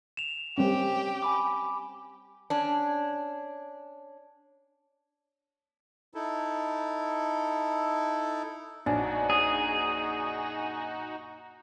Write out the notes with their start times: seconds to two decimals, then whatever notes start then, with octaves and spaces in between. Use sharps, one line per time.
0.17 E7 F7
0.58 G3 C4 C#4 G4
1.23 G#5 B5 D6
2.50 C#4 D4
6.14 D#4 E4 A4
8.86 A#1 F#2 D4 D#4 F#4
9.30 G#4